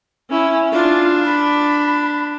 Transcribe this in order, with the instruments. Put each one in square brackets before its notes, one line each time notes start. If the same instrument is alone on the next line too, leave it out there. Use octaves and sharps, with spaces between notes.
[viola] C#4 E4
[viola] D4 [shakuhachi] F4
[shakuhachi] B5